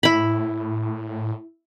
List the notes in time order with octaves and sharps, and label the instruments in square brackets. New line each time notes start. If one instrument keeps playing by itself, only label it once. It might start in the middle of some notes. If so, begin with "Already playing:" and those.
[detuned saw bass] A2 [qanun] E4 B5